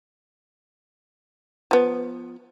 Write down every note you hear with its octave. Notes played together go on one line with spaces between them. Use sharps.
F3 B3